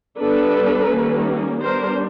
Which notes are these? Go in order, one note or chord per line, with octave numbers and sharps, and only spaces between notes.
G3 B3 D4 A4 B4
D#3 G3 A#3 C#4
G3 B3 D4 A#4 C5